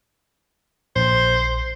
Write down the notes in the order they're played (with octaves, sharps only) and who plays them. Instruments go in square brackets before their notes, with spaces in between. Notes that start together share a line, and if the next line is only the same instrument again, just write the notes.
[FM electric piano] A#1 [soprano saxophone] C5